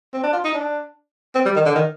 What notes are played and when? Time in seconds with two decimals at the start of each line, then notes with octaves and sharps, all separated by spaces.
0.14 C4
0.24 D4
0.33 F4
0.45 D#4
0.54 D4
1.35 C4
1.46 G3
1.56 D#3
1.66 D3
1.76 D#3